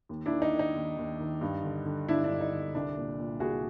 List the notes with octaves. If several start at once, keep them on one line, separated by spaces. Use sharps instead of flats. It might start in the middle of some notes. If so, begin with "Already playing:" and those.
D#2
D4 E4
D#3
D#4
D#3
D#4
D#2
D#2
D#3
G2
D3
D3
G2 D4 E4
D4
G2
D#4
D3
C2 D4
A#2
A#2
C2 F#4 G#4